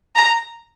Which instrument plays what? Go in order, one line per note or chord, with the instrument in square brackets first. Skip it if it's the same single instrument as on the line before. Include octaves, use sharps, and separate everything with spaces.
[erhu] A#5